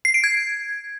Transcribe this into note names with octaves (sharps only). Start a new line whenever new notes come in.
C7
D7
G#6